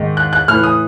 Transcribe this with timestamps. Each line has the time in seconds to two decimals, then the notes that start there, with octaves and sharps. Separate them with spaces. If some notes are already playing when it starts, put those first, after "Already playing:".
Already playing: G#2 D#3
0.17 F#6
0.33 F#6
0.48 A2 E3 F6
0.63 D#6